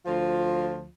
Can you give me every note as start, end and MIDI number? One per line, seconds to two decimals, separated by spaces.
0.06 0.87 38
0.06 0.87 53
0.06 0.87 65